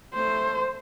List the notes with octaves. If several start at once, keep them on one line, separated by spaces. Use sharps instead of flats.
A3 C5